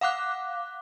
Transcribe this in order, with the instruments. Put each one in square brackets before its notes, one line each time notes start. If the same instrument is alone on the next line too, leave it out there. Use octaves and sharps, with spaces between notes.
[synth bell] F5 F#5 D6 F#6